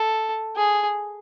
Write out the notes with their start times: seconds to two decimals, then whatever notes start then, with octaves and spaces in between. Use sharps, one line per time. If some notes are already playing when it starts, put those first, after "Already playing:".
Already playing: A4
0.56 G#4